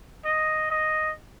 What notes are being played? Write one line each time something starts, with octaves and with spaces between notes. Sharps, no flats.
D#5
D#5